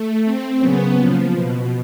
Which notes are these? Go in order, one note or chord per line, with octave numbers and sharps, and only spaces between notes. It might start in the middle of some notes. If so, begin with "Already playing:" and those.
Already playing: A3
C4
C#3 F#3 A#3 B3 C#4
F3
B2